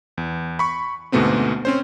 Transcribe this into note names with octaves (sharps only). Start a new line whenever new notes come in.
E2
B5 C#6
D2 G#2 B2 A3 B3 C4
C4 C#4 C5